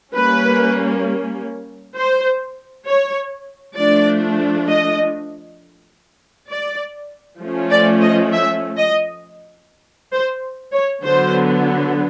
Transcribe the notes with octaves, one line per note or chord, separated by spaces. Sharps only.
G3 A#3 C#4 B4
C5
C#5
F3 A3 D4 D5
D#5
D5
F3 A3 C#4
D5
D#5
E5
D#5
C5
C#5
D3 F#3 B3 C5